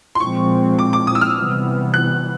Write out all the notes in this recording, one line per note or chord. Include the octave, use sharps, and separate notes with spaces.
C6
A#2 F3 G#3 C4 C#6
D6
D6
D#6
E6
F6
C3 E3 G3 B3
F#6